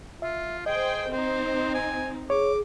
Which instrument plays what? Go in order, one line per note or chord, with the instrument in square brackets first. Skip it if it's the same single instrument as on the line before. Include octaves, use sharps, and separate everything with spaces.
[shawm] F4 [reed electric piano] E5
[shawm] G#4 [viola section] C5 G5 [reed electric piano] D#5
[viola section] C4 D#4 [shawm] C5
[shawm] G#5
[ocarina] G#4 [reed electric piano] C#5 [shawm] D6